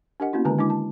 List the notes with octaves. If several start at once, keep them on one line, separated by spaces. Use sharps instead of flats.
D4 G4 A#4 D#5 F#5
A#3 B3 C#4 E4 F#4
D3 D#3 G#3 B4 G#5 A#5
G#3 D4 E4 D6
A5